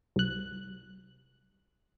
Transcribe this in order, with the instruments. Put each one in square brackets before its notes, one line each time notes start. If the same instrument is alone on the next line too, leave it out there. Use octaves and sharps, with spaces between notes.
[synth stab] C2 F#6